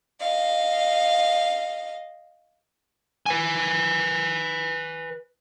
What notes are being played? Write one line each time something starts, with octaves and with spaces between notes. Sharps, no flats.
D#5 F5
B4 G#5